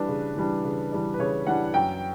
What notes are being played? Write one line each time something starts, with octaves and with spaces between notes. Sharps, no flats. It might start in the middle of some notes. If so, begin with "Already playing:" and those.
Already playing: E3 G3 D4 B4
C#3
E3 G3 D4
C#3
E3 G3 D4
B4
C#3 C#5
E3 G3 D4 F#5
F#2 G5